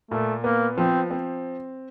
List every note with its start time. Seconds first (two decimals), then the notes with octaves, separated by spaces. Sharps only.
0.11 A#2 A3
0.44 A#3 B3
0.78 F3 C4
1.10 C4